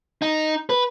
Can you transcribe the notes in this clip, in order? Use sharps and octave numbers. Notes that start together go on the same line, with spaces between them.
D#4
B4